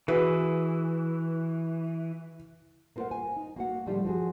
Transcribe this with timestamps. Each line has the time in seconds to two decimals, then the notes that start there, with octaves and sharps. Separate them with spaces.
0.08 E3 F#4 G#4 B4
2.96 A#3 B3 F4 A#4 C5 F#5
3.11 G#5
3.36 D#4
3.56 A#3 F#4 F#5
3.86 A2 D3 F3 G3 G#3 F4
4.05 F3 F#4 G#4